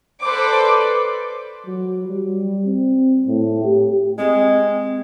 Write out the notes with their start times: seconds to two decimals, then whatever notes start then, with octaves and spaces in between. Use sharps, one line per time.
0.21 A4 B4 C5 D5 D6
1.67 F#3
2.09 G3
2.66 C4
3.28 A2
3.64 G4
4.18 G#3 C4